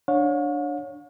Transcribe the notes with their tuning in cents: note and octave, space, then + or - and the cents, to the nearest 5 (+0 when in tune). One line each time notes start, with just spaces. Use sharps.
D4 +0 C#5 -5 F5 +45